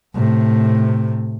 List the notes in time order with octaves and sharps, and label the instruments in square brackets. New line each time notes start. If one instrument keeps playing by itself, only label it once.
[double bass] A2 C3